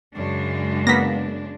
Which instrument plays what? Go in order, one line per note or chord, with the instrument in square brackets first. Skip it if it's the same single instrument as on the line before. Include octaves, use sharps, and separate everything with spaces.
[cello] F#2 [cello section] C#3 G#3 D4
[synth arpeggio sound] A#3 B3 [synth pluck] A#6 B6